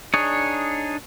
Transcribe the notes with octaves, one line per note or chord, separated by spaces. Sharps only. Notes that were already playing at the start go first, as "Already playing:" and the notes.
D4 D#4 G#4 C#5